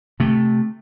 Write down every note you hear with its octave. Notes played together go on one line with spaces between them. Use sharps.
C3 A3